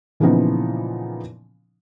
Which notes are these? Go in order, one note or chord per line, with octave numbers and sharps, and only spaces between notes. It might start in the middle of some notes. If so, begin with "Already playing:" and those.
A#2 C#3 E3 F3 B3 D#4